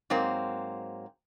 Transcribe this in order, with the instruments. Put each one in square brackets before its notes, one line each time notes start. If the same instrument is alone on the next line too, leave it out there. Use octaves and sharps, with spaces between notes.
[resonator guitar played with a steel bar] G#2 F#3 A#3 C4